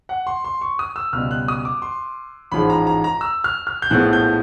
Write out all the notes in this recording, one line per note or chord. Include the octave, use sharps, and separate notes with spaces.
F#5
C6
C6
C#6
D#6
E6
C#2 B2 G3 F6
F#6
D#6
D6
C6
A1 G#2 F3 G#3 B5
A#5
A#5
A#5
E6
F6
F6
G6
A#1 A2 F3 G#3 B3 F#6
G6